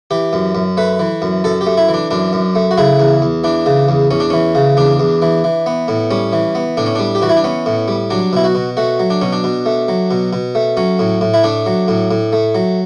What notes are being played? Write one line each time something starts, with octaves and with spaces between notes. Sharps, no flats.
E3 G4
F#2
F#2
A3 B4
E3
F#2
F#2 A4
G4
A3
E4
E3
D4
F#2 D4
F#2
A3
F#4
C#3 E4
E2
E2
E3 D4
C#3
E2
E2 C#4
D4
E3 C#4
C#3
E2 D4
E2
E3
E3
B3
A2
G3 C#4
E3
B3
A2 D4
C#4
G3 D4
G4
E3 F#4
E4
D4
B3 C#4
A2
G3
F#3 D4
B2 E4
F#4
B2
A3 F#4
F#3
D4
B2 C#4
D4
B2
A3
F#3
B2
B2
A3
F#3 C#4
A2
A2
E4
A3 D4
F#3
A2
A2
A3
F#3